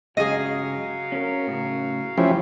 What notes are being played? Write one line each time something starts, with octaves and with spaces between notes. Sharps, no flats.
G2 C#3 F#3 G#3 G#4 D#5 F5
C#4 A#4
A2 C#3
F#2 F3 A3 C#4 E4 G4